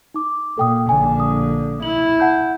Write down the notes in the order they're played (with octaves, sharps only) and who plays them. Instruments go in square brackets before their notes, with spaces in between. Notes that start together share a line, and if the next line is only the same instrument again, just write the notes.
[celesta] D#4 D6
[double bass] A#2 [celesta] A4 G5 D#6
[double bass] A#1 D3 [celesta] G#5
[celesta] D#6
[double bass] E4 [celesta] F#7
[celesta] F#5 A5 G6